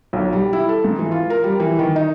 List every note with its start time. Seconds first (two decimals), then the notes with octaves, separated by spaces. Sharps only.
0.13 B1
0.33 G3
0.53 E4
0.69 A4
0.85 G#2
0.99 E3
1.11 F4
1.30 A#4
1.44 G3
1.60 E3
1.79 D#3
1.96 D#4